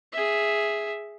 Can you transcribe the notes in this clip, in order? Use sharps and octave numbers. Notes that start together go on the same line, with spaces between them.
G#4 E5